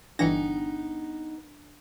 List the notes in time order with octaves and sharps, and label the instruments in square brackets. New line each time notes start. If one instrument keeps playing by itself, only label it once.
[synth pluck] G1 E3 A#6 [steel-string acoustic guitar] B3 D#4 [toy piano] D4 G5